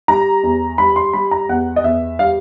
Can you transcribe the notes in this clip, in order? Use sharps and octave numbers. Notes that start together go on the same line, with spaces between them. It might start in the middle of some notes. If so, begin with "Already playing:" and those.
G3 A#5
E2
G3 B5
C6
G3 B5
A#5
E2 F#5
D#5
E2 E5
G3 F5